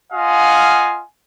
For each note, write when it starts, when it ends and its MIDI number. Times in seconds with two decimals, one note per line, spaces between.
0.12 1.01 65
0.12 1.01 75
0.12 1.01 77
0.12 1.01 78
0.12 1.01 80